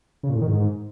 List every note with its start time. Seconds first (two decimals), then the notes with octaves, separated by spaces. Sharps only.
0.23 C#3
0.29 A#2
0.35 A2
0.41 D#3
0.47 G#2